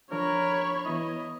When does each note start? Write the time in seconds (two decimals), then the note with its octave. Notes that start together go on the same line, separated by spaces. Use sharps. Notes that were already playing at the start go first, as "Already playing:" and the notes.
0.12 F3 D4 A#4 C#5 B5
0.86 E3 B3 E4 D#5